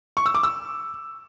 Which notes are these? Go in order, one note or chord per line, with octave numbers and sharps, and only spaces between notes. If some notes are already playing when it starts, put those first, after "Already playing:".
C#6
E6
D6
E6